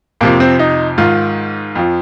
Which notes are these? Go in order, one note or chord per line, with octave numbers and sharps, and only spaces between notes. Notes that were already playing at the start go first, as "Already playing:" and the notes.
F2 C3 F3 A#3
C4
D#4
G#2 D#3 F4
F2 F3